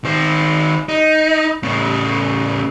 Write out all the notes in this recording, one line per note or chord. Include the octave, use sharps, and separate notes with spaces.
D#3 C5
D#4
A2 C#3